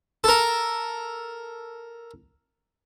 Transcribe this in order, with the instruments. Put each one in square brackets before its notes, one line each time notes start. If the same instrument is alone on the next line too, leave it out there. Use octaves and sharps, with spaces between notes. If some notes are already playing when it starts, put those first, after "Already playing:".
[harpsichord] A4 A#4